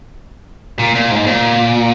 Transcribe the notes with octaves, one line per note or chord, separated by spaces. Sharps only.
A#2
A#2
G#2
A#2